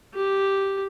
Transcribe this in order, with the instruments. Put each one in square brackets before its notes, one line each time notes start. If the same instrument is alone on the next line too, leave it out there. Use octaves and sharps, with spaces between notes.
[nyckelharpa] G4